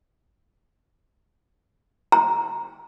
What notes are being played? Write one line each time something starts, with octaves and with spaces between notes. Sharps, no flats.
A#5